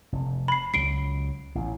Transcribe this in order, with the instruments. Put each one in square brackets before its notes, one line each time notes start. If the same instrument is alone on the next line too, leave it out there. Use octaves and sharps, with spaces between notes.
[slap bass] F1
[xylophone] B5 C7
[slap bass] C#2 F#3 [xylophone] C7 D7
[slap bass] A1